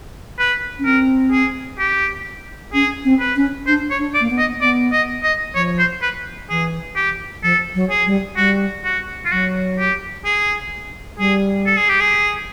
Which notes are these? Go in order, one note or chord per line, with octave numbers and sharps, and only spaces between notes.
B4
C#4
C4 A#4
G#4
G4
C#4 G#4
C4
B4
C#4
D4 C5
C#5
D4
D5
A#3
B3
D#5
B3 D5
D#5
D#5
F3 C#5
C5
B4
E3 G#4
G4
F3 A4
F#3
G#4
G3
G3 F#4
F#4
F4
F#3 F#4
G4
G#4
G3 G#4
A4
G#4
G4
G#4